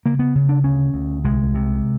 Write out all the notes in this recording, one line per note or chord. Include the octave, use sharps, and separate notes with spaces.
C#3 A#3
B3
C#3
D4
D2 C#4
D2
C2 G#3
C3